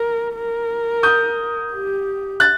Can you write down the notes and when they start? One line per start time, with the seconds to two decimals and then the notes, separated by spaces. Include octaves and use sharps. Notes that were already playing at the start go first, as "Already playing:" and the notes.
Already playing: A#4
0.35 A#4
1.03 D#6 G6
1.72 G4
2.40 F#6 A6